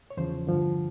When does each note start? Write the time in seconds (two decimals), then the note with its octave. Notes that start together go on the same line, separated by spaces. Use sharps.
0.10 C#5
0.17 E2 C#3 F3 C5
0.47 G2 D3 F3